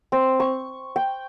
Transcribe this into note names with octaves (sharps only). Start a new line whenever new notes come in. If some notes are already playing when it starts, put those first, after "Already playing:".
C4
C#6
G5